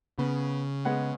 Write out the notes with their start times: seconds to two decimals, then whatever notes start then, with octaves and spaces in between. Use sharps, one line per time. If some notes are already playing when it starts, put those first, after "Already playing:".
0.18 C#3 B3
0.85 G#3 B3 F#5